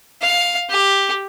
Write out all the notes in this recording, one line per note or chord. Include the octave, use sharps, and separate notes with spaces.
F5
G4